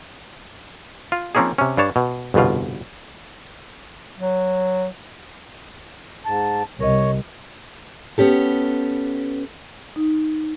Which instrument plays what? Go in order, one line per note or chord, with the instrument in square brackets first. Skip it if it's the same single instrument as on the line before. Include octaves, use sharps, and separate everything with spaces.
[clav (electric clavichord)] F4
F3 A#3 C4 C#4 D#4 G#4
C3 C#4
G2 D4 C#5 A5
B2
G1 C2 F2 B2 F4
[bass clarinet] F#3
[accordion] G#2 A5
[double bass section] C2 [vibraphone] A#4 D#5 [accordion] C#5
[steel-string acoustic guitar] B3 C#4 G4 A4
[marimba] D#4